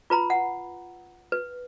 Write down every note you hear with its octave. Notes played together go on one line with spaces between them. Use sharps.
F4 B4 A#5 B5
F#5
B4